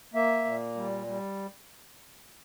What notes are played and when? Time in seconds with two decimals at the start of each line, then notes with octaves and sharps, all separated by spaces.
0.14 A#3 E5
0.45 A#2
0.76 G3
1.06 G3